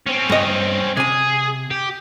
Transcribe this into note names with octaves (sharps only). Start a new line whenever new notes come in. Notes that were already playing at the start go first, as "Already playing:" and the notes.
C4 C#4
G2 D#5
C3 G#4 G#5
G4